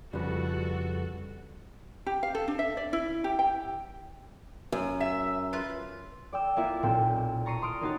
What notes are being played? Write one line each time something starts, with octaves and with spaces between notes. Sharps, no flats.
F2 C#3 F3 G3 F#4 A4 B4
G4
F5
A4
D4
E5
D5
E4
G4
G5
F#2
E5
F4 B4
D5 G5 E6
A#3 C4 E4 F4 D5 E5
B1 A#2 C4 G5
A5 A#5 C#6 C7 D#7
C6 D#6 F6 D7
A#3 C#4 D#4 F#4 C6 A6